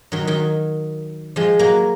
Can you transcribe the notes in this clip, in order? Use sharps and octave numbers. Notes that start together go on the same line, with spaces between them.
D#3 F#3
D#3 F#3
F3 G#3
F#3 A#3